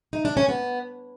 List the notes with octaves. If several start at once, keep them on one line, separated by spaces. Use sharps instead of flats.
D#4
D4
C#4
B3